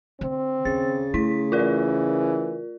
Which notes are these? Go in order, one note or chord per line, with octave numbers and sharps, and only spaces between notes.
D3 C4
D#2 C#3 A6
A3 E4 B6
E3 F4 A#4 D5